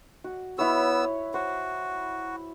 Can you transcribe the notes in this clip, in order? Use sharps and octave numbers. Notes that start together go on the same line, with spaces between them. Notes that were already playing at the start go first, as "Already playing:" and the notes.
F#4
B3 E4 C#5 E6
F#4 C5